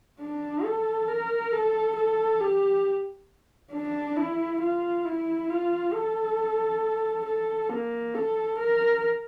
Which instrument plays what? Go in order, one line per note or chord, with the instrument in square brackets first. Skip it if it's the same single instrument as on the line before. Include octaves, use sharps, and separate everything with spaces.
[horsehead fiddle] D4
A4
A#4
A4
A4
G4
D4
E4
F4
E4
F4
A4
A4
A#3
A4
A#4